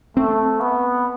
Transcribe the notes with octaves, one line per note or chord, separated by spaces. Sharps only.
A3 C4
B3